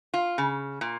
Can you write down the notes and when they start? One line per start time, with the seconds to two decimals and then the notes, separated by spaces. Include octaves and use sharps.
0.14 F4
0.38 C#3
0.81 A#2